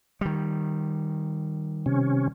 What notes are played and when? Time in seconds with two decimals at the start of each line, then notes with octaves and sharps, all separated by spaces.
0.21 D#3 G3
1.86 C3 C#4